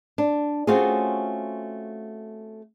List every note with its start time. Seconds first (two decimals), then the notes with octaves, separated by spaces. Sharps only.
0.18 D4
0.67 A3 C4 C#4 F4 F#4 G#4